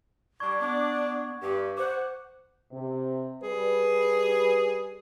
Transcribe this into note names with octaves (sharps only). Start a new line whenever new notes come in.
G3 D4 C#6 G#6
B3 D4
G2 G4
C5 F#5 D6
C3
G3 G#4 B4